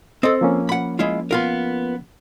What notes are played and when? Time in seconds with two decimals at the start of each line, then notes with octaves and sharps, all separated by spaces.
0.23 C4 A4 D#5
0.41 F3 A#3 C#4
0.69 F#5 B5
0.99 G#3 E4 F4
1.31 B3 F4 A#4